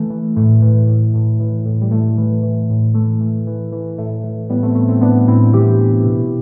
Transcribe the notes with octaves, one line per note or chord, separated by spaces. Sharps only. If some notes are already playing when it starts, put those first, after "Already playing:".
Already playing: E3 A3
E3
A2 A3
E3
A2
A2
E3
A2
G3
A2 A3
E3
E3
A2
E3 A3
E3
E3
E3
A2 A3
E3
A2 G3 B3
A3 C4
A2 A3
A3 C4
A2 B3 D4
A2 C4 E4
E3 E4 G4
E3
B2